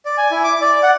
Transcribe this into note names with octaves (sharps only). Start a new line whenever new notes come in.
D5
G#5
E4
D6
D5
F#5